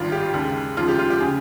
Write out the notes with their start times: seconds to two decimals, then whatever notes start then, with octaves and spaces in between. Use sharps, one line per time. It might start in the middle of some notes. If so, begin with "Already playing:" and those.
Already playing: G#1 G2 D#3 F4
0.12 G4
0.34 D#2 C#3 G#3
0.77 D#2 C#3 F3 G#3 F4
0.88 G4
0.99 F4
1.10 G4
1.21 C#3 G#4